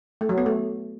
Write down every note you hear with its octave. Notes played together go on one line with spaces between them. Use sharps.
A3
F#3
B3
A3